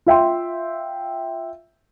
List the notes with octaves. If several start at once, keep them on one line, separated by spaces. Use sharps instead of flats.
F4 E5 G5 C6